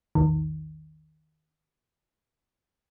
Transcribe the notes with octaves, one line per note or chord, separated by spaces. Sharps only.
A#1 E2 D#3